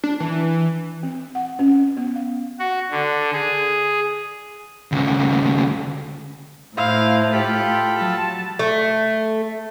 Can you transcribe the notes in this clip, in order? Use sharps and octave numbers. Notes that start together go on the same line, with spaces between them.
D4
E3
C4
F#5
C#4
B3
F5
F#4
D3
G#4
D2 C#3
A2 E4 C5 F5
F4 G4 A4 B5
F#3 A5
A3